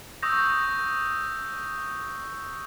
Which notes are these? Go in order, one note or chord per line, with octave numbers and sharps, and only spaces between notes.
C#6 D#6 E6 G6 A#6